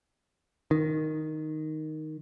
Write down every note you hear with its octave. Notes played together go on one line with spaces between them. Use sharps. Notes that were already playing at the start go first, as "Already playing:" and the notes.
D#3